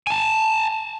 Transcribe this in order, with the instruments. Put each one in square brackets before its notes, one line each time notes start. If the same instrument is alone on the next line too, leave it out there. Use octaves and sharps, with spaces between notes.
[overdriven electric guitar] G#5 A5